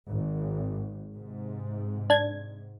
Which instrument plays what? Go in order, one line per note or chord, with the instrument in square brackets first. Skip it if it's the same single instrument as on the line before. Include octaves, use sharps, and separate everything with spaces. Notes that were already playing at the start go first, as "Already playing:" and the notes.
[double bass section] G#1
G#2 C3
[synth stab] D4 G#6